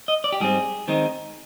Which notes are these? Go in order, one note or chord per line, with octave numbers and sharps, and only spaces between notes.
D#5
D5
G4
G#2 G3 C4 G#4
D#3 G#3 C4 D#4